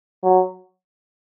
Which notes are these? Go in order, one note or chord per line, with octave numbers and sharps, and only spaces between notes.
F#3